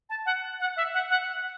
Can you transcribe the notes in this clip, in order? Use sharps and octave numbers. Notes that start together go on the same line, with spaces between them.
A5
F#5
F#5
E5
F#5
F#5